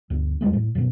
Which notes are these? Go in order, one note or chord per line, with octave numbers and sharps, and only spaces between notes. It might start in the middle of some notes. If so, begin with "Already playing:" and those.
D2 G2
E2 G3 G#3 A#3
A2
F#2 B2